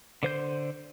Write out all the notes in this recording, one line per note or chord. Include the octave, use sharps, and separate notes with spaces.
D3 C5 G6